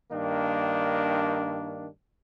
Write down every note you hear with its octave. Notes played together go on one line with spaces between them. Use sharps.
G2 D#3 A#3 D4